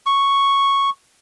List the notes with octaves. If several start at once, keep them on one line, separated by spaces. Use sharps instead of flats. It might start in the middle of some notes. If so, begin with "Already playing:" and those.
C#6